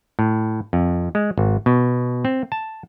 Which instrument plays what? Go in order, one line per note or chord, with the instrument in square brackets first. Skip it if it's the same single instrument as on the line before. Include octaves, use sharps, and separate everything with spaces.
[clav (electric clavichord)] A2
F2
G#3
G#1
B2
C4
A5